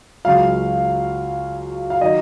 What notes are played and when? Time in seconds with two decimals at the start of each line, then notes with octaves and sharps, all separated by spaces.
0.25 C#2 C#3 F#3 F5
1.90 F5
2.01 D#3 F#3 D#5